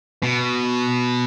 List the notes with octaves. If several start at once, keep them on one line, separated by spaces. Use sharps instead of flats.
B2